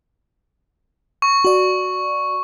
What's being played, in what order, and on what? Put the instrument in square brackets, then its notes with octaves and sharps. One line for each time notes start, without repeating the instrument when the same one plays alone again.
[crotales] C#6
[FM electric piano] F#4 D5